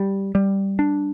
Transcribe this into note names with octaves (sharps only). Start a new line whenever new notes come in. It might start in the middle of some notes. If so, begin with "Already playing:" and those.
Already playing: G3
G3
D4